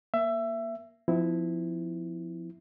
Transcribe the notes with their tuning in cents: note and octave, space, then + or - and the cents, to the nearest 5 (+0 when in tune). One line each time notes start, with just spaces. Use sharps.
A#3 +15 E5 +20
F3 +0 C4 -40 E4 -5